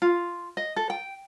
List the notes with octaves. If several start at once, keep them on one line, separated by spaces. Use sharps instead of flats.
F4
D#5
A4
G5